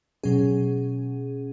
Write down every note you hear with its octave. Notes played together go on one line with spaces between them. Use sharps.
B2 F#3 C#4 G#4